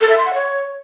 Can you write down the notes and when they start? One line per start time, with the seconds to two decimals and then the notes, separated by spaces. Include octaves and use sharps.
0.01 A4
0.09 E5
0.18 C6
0.26 F#5
0.34 C#5